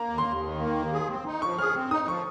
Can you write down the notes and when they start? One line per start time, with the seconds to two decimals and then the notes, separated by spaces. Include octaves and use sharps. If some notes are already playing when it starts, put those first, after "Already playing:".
Already playing: A#3 A#5
0.09 D#2
0.18 C6
0.26 D#2
0.43 D#3
0.59 A#3
0.76 D#2
0.92 G#4
1.09 C4
1.26 D#4
1.42 F3 C#6
1.59 G#4 F6
1.74 C4
1.91 D#4 D#6
2.07 F3 C#6